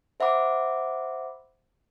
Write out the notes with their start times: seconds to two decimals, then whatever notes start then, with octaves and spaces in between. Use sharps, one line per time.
0.20 C5 E5 F#5 B5 D6